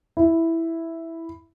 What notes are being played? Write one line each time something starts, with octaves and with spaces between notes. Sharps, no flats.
E4